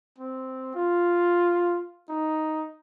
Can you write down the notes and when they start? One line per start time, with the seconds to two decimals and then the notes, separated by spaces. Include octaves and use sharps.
0.18 C4
0.75 F4
2.09 D#4